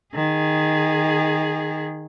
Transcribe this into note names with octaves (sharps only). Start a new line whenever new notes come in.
D#3 G#4